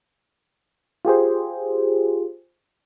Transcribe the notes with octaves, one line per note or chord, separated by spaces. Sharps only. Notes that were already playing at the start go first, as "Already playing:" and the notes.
F4 G4 G#4 C5